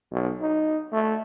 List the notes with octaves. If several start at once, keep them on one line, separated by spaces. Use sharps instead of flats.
B1
D#4
A3